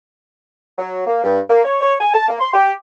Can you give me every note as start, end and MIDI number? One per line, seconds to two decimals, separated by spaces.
0.78 1.05 54
1.07 1.23 58
1.24 1.39 43
1.49 1.64 58
1.64 1.80 73
1.81 1.94 73
2.00 2.10 80
2.14 2.25 81
2.29 2.35 58
2.40 2.53 84
2.54 2.72 67